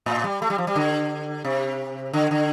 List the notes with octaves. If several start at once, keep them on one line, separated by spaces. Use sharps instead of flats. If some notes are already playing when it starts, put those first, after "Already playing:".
A2
G3
A3
G3
F3
G3
D3
C3
D3
D3